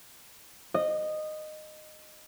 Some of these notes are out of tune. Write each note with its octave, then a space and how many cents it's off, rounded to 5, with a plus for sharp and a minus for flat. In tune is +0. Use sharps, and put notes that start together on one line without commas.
D#5 -15